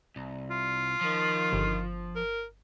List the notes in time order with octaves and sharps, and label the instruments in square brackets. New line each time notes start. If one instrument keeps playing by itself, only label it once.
[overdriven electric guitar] C2
[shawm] F4
[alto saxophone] D#3 [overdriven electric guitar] F3
[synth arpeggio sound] G1
[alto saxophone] A#4